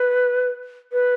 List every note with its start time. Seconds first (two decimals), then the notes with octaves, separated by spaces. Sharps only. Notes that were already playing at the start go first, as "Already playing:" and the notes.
Already playing: B4
0.92 B4